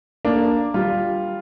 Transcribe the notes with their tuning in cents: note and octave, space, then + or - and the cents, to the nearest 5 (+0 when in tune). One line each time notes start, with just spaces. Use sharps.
A#3 +0 D4 +0
G3 +0 F4 +0